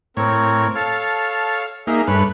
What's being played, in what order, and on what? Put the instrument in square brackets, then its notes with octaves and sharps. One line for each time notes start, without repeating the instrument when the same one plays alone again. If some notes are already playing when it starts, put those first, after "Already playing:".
[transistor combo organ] A2 C#5 [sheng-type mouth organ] C4 A#4
[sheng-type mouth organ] A4 C#5 A5 [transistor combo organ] F5
[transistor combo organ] A#3 D#4 [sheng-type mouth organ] G#4 E5
[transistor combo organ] G2 B4 [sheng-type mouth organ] A3 C#5